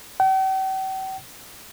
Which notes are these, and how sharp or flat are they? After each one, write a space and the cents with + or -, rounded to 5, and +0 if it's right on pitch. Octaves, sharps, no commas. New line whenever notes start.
G5 -45